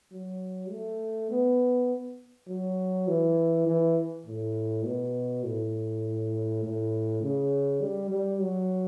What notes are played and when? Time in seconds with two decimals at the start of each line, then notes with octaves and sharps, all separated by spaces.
0.12 F#3
0.71 A3
1.31 B3
2.49 F#3
3.08 E3
3.67 E3
4.27 A2
4.85 B2
5.45 A2
6.64 A2
7.23 C#3
7.81 G3
8.11 G3
8.41 F#3